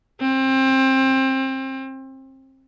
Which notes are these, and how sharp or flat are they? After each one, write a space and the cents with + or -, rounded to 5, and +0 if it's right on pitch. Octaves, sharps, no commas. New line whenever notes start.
C4 +25